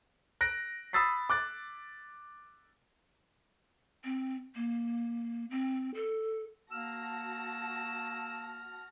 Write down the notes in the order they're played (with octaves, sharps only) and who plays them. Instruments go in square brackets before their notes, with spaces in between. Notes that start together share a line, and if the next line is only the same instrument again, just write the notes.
[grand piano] F#6 A#6 D7
B5 D#6 E6 A6 B6 C7
D6 F#6 A6
[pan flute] C4
A#3
C4
A4
[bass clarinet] A#3 [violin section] F#4 A5 A#6 [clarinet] E6 [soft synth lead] F6